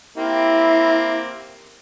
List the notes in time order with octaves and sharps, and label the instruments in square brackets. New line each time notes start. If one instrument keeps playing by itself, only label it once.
[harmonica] A#3 C4 G4 [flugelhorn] E4